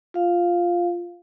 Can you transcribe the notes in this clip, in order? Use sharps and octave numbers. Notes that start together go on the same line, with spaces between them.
F4 F5